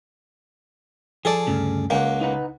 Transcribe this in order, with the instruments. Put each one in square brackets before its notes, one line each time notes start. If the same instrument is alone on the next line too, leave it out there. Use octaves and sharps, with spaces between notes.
[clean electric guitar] F3 [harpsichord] G#4 A4 D5
[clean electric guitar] D2 G2 C#3
[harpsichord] C#2 A#3 [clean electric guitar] F#5 G5
[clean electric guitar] D#4 B4 F#5